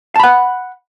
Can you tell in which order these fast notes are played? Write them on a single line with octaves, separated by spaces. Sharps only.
A5 B5 F#5